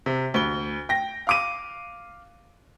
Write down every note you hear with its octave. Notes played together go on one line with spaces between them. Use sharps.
C3
D2 G7
G5 A#6
F5 D6 D#7